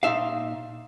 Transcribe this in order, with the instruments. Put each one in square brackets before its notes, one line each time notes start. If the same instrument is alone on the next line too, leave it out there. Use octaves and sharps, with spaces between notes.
[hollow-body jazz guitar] A#2 D#4 E5 F5